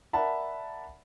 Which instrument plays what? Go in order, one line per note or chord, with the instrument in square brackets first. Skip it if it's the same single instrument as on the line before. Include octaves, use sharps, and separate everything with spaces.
[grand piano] A#4 D5 E5 F#5 A5 B5